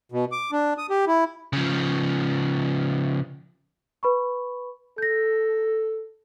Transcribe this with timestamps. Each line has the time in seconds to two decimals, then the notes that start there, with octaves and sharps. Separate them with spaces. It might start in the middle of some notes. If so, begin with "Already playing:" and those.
0.12 B2
0.32 D6
0.52 D4
0.78 D#6
0.90 G4
1.07 E4
1.53 C#3 F3
4.03 B4 B5 C#6
4.98 A4 G6 A#6